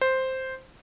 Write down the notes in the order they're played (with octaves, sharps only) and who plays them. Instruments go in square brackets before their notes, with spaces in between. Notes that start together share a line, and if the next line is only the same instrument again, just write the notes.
[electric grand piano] C5